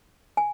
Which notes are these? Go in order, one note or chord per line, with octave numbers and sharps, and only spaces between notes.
G#5